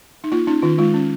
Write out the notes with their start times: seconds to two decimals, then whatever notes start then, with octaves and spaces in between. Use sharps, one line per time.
0.24 D#4
0.32 A#3 F4
0.47 C#4 D#4
0.63 D#3 F4
0.78 G#3 F4
0.94 C#4